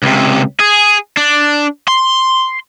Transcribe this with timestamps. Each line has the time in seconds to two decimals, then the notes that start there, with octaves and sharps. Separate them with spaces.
0.03 C#2 C3
0.60 G#4
1.17 D4
1.88 C6